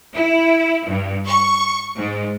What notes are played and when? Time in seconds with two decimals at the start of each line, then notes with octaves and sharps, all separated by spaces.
0.14 E4
0.88 G2
1.28 C#6
1.96 G#2